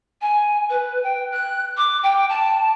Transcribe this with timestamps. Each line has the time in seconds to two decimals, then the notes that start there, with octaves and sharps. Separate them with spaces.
0.22 G#5
0.70 B4
1.03 G5
1.32 F#6
1.77 D6
2.03 G5
2.29 A5